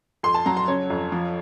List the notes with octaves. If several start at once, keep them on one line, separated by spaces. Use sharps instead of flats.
F2 C6
A5
F#3 A#5
C6
C#3 C#5
F2
F3